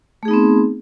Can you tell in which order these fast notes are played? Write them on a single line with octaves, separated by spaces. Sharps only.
A3 G#4 D#4 B3 C4